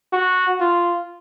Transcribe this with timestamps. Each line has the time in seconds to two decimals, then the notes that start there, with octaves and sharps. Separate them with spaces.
0.13 F#4
0.60 F4